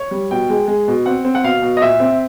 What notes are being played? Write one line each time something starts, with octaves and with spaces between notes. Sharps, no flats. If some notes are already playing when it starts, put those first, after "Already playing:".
Already playing: C#5
G3
B2 G5
G#3
G#3
B2
C4 F#5
C4
F#5
B2 F5
B2
D#5
A#2 E5
C4